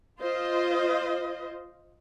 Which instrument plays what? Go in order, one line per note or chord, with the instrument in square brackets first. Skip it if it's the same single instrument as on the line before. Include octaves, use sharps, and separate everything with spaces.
[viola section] F4 C5 D#5